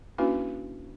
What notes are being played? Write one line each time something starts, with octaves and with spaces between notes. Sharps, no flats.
A#3 C#4 D4 E4 F#4 B4